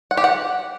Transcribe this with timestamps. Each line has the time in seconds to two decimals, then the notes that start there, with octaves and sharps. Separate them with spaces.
0.11 F#5
0.17 G4
0.24 F#5